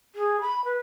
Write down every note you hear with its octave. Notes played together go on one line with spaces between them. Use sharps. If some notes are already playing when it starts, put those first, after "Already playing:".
G#4
B5
B4